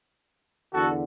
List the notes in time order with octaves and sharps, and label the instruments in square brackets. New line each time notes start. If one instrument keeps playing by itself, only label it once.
[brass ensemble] E2 D3 F#4 A4